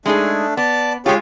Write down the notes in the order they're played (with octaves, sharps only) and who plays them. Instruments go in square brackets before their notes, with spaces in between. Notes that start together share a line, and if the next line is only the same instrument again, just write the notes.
[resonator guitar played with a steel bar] G#3 D#4 G#4 [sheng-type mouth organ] A3 D4
[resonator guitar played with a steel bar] B3 [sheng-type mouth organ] D5 A5
[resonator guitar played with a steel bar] G#3 F4 [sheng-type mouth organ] G4 G#4 C#5